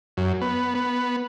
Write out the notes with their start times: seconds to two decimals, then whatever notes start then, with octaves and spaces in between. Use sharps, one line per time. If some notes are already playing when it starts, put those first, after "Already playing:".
0.17 F#2
0.42 B3
0.75 B3